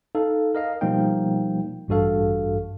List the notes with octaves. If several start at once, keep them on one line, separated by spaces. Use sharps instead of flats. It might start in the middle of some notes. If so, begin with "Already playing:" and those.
D#4 A4 F5
A#4 D#5 F5
B2 F3 G3 A#3 D#4 G5
A1 G2 F#4 A4 F5